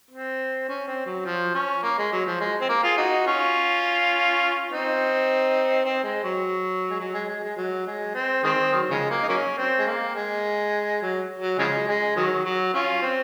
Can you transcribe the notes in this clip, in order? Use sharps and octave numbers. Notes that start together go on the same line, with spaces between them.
C4
C#4
C4
F#3
F3
C#4
A#3
G#3
F#3
F3
G#3
C4
A#3
F4 G#4
D#4 F#4
C#4 F4
C4 D#4
C4
G#3
F#3
G#3
F#3
G#3
G#3
G#3
F#3
G#3
C4
D#3 G#3 C4
D#3 F#3
C#3 F3 G#3
A#3
D#4
F#3 A#3 C#4
C4
G#3
A#3
G#3
F#3
F#3
C#3 F3 G#3
G#3
D#3 F#3
F#3
C#4 F4
C4